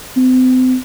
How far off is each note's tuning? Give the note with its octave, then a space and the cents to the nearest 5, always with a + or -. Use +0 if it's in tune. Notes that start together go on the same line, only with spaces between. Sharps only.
C4 -40